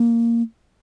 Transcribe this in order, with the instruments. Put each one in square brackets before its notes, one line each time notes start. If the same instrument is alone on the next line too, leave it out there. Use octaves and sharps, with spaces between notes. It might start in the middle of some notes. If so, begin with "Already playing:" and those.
Already playing: [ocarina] A#3